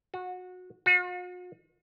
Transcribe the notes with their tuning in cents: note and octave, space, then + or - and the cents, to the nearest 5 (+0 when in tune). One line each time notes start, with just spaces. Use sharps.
F#4 -20
F#4 -45